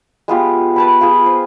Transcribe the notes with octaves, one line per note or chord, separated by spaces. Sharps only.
G#3 B3 F4 G4
B4 A5 B5
F4 G#4
C5